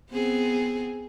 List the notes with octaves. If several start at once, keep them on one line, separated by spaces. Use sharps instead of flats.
B3 C4 G#4